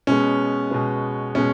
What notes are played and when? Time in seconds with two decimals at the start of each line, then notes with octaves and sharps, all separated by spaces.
0.07 B2 G#3 B3 C#4
0.71 B2 G#3 B3
1.35 B2 G#3 B3 C#4